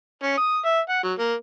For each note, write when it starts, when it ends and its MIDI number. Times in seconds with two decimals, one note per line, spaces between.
0.23 0.34 61
0.37 0.59 87
0.65 0.80 76
0.89 1.00 78
1.03 1.13 54
1.19 1.34 58